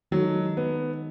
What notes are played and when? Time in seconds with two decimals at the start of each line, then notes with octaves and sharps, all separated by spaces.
0.11 D#3 F#3 G#3 D#4 A4
0.57 B3